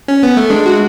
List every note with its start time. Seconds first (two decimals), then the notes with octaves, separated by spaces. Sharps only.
0.08 C#4
0.23 B3
0.37 A3
0.50 G#3 D4
0.66 F#4